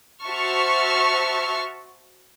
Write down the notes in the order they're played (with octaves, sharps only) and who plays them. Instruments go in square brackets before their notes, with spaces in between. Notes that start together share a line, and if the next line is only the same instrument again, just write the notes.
[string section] F#4 C5 E5 A5 C#6 F6